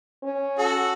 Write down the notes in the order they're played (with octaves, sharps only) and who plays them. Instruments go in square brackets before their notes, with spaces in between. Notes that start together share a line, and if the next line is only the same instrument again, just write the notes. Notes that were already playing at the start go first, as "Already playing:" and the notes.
[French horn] C#4
[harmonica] F#4 A4